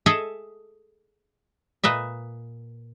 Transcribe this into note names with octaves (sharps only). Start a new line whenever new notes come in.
G#4 A4 D#5 E5
A#2 B4 D#5 E5